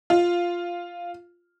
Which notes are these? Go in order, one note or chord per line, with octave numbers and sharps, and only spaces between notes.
F4